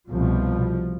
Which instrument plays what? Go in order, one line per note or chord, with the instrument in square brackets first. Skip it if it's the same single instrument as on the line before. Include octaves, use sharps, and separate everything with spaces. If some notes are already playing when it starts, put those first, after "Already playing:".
[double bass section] C2 B2 F3